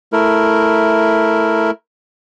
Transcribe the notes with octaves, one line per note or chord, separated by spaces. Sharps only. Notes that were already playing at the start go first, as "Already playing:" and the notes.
A3 E4 A#4